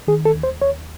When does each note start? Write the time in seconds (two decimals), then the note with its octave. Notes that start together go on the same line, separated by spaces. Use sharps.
0.07 D#3 G#4
0.25 A4
0.35 D#2
0.43 C5
0.61 D#2 C#5